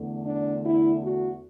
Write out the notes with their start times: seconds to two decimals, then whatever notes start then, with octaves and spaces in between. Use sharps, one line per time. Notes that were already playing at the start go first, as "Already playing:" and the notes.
Already playing: E2 D3 A3
0.25 D4
0.63 E4
1.01 F#4